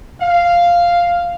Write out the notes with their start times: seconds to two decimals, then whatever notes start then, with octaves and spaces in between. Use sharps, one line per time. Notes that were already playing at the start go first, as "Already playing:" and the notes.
0.21 F5